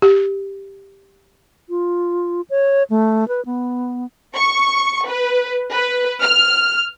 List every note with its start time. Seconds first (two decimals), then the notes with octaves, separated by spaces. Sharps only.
0.02 G4
1.69 F4
2.50 C#5
2.90 A3
3.28 B4
3.46 B3
4.36 C#6
5.07 B4
5.72 B4
6.21 F6